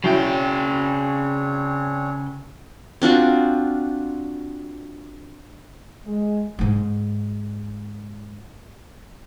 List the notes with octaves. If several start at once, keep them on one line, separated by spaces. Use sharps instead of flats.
C#3 F#3 C4 D4 E4 C#5 G5
C4 D4 F4 F#4
G#3
G#2 G#3